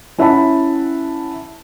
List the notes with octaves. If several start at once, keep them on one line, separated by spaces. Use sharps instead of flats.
C#4 E4 E5 F#5 A5 B5